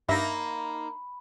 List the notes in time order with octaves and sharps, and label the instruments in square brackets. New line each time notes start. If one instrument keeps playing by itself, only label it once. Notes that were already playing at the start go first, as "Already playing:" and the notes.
[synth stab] G2 E5 A#6 [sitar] A#3 D#4 [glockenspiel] B5